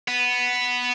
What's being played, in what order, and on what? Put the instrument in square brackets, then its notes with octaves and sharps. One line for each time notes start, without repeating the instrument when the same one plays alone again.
[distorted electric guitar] B3